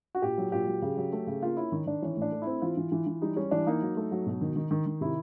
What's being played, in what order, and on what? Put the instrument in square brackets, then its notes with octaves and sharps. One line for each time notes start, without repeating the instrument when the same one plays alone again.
[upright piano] F#4
A#2 G4
F#3
A#2 G4
F#3
C#3
F#3
A3
C#3
A#3 F4
C#4 E4
D#3
D#3 D4
E3 C#4
A2
D4
A3
E4
C4
E3 F4
E3
E3
E3
G3 D#4
G3 C#4
E3 D4
A#3 D#4
F#3
A3
F#3
B2
D#3
D#3
D#3
D#3
C3 E4